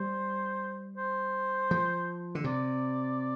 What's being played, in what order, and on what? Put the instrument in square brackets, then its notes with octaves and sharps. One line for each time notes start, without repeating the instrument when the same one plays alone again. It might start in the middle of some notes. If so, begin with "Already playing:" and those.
Already playing: [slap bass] G3 [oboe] C5
[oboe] C5
[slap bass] F3
D3
[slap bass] C3 [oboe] D5